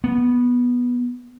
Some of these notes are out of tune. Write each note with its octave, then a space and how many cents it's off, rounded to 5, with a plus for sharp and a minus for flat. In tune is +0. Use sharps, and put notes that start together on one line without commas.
B3 -10